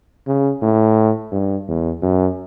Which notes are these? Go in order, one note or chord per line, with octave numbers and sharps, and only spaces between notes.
C#3
A2
G2
E2
F#2